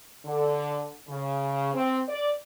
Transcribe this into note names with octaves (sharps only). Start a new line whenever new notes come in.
D3
C#3
C4
D5